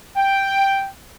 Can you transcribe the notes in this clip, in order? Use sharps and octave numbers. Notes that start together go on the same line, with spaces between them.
G5